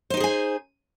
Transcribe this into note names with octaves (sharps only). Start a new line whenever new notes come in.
D#4 G4 G#4 C5 G#5